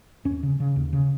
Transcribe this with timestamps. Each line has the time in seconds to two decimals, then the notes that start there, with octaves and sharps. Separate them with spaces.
0.25 D#2 C#4
0.43 C#3
0.60 C#3
0.76 D#2
0.93 C#3